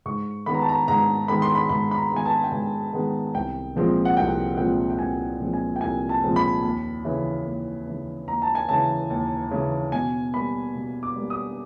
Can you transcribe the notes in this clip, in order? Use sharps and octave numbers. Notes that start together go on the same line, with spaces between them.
G#2 C#6
D#3 G#3 B3 B5
A#5
A5
A#5
G#2 A#5
D#3 G#3 B3 B5
C6
B5
G#2 B5
B5
A#5
D#3 G#3 B3 G#5
A5
G5
G#2 G#5
D#3 G#3 B3
C2 G5
A#2 F3 G#3 C4
F#5
C2 G5
A#2 F3 G#3 C4 G5
G5
C2 G#5
A#2 F3 G#3 C4
G#5
G5
C2 G#5
A5
A#2 F3 G#3 C4
B5
D#2
C#3 E3
D#2
C#3 E3
D#2 A#5
A5
G#5
C#3 E3 A5
D#2
C#3 E3
B2 G#5
G3 A#3 B5
B2
D6
G3 A#3
D#6